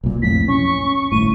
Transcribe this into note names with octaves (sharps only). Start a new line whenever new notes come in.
B1 A#2
B1 F2 A2 B6
C#4 C#6
G1 A2 D#7